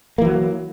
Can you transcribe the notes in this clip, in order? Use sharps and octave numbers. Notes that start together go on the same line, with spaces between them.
E3 F#3 A#3